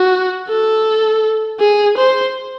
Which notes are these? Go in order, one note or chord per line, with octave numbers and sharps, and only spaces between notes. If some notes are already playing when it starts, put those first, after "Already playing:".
Already playing: F#4
A4
G#4
C5